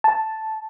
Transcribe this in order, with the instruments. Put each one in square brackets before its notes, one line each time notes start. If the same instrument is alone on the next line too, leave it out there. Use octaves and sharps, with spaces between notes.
[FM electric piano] A5